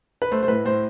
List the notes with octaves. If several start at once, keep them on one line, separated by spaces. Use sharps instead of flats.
B4
A3 C5
C5
A2 B4
A2 C5